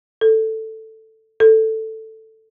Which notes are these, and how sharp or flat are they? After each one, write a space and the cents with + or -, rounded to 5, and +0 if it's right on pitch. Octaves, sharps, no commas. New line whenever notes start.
A4 +5
A4 +5